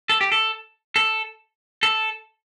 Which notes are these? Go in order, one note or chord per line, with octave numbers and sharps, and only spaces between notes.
A4
G4
A4
A4
A4